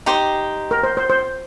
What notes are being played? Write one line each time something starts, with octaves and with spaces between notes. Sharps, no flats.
D#4 G4 C5
A#4
C5
C5
C5